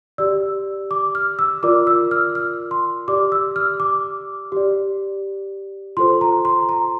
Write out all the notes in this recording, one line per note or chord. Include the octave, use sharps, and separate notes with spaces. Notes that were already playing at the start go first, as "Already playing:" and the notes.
G4 D5 E6
D6
F6
E6
F4 A#4 D5 D6
E6
F6
F6
C6
G4 D5 D6
E6
F6
D6
G4 D5
F4 A4 C5 C6
A#5
C6
A#5